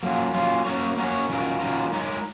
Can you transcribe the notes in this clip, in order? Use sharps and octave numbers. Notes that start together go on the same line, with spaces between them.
F#3 A#3 C#4 F4
F#3 A#3 C#4 F4
A#3 C#4 F#4 A#4 C#5
A#3 C#4 F#4 A#4 C#5
D#3 F#3 C#4 F4 A#4
D#3 F#3 C#4 F4 A#4
G#3 D#4 A#4 C#5